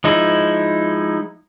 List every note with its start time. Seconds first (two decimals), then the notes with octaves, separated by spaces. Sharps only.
0.04 F3 G#3 D#4 E4